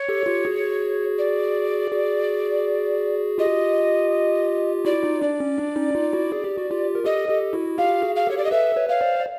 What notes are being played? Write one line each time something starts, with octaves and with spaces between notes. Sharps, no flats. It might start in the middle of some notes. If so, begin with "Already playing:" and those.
Already playing: C#5
G4 A4
F4 G4
F#4 G#4
D5
F#4 G#4
F4 G4 D#5
E4 F#4 D5
D#4 F4
D4 D5
C#4
D4
C#4 D#4
D#4 F4
E4 F#4
G#4
G4
F#4
F4 G4
A#4
G4 A4 D#5
G4 A4
E4 F#4
F4 G4 F5
F#4 G#4
F5
G4 A4 C#5
D5
D#5
A4 B4 E5
B4 C#5
C#5 F5
C5 D5
D5